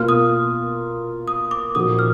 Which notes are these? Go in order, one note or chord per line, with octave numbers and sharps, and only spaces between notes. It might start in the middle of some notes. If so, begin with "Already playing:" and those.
Already playing: B2 A#3 F4 F6
D#6
D#6
D6
A#2 F3 A#3 D#4 F#4 D#6
F6